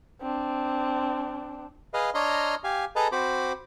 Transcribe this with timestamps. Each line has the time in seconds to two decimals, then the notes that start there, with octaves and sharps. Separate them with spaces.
0.21 C4 D4
1.94 G#4 B4 D#5 F5
2.14 D4 C#5 D#5 A#5 C6 F6
2.64 G4 F5 G#5
2.96 G#4 A4 B4 D#5 A5 A#5
3.12 C4 F#4 C5 B5 D6